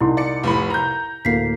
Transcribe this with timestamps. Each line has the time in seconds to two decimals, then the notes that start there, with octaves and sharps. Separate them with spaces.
0.01 C2 D#4 E4 C6
0.17 D5 C#7
0.43 F1 A2 B5
0.70 A#5 G6
1.25 D2 A2 A#3 B6 C7